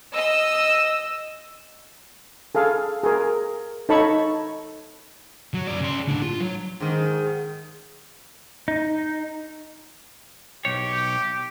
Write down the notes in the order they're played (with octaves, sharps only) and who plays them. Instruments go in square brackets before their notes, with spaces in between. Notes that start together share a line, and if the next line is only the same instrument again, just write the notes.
[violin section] D#5 E6
[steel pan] G#4 A4 F5
G#4 A#4
D#4 A4 C#5 A5 B5 C#6
[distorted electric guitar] F#3
F#2 D5
C#3 C6
A2 D4
F4
F#3
[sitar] G#2 D#3
[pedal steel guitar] D#4
[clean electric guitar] B1 C#5 [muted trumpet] G4